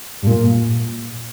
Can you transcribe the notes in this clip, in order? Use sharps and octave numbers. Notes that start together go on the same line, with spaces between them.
G2
A#2